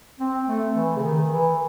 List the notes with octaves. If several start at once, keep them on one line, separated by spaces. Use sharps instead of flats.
C4
A3
E3
C#3
D#3
E3